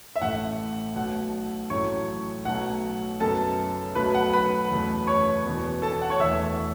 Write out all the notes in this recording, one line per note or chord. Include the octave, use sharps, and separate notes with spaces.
E5
A1 A2 A3 F#5
B1 B2 A3 F#5
A1 A2 F#3 A3 C#5 C#6
B1 B2 F#3 A3 F#5
F#1 F#2 F#3 B3 A4 A5
B1 B2 F#3 A3 B4 B5
F#5
B4 B5
F#1 E2 B2 A3
C#5 C#6
E1 E2 B2 B3
A4 A5
A4 A5
F#5
C#5 C#6
E1 E2 E3 A3 E5 E6